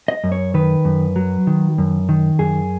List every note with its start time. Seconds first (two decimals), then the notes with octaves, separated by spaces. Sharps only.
0.08 D#5
0.24 F#2
0.32 C#5
0.54 D#3 B4
0.85 F#2
1.16 F#3
1.47 D#3
1.78 F#2
2.09 D#3
2.39 F#2 G#4